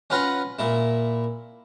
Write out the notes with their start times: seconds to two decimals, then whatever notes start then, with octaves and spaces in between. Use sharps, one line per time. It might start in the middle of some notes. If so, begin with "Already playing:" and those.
0.10 C#4 F4 B4 F#5 A#5
0.59 A#2 E4